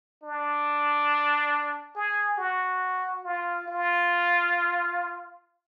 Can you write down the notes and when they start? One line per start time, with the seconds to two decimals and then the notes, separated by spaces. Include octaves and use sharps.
0.23 D4
1.96 G#4
2.38 F#4
3.24 F4
3.68 F4